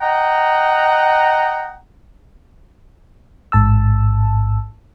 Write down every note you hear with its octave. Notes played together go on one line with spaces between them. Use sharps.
D#5 F#5 G5 A#5
A1 G#2 A5 E6